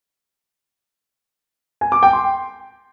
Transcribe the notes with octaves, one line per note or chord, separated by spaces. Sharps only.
G#5
D6
G5
C6